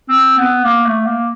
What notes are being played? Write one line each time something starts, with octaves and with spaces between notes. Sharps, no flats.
C4
B3
A#3
A3
A#3